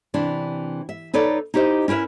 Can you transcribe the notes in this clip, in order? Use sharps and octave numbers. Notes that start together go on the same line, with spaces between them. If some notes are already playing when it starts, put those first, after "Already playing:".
C3 E3 D4
E5
D#4 A4 B4 C#5 D5
D#4 E4 G4 C5 D#5
C#4 E4 A#4 B4 E5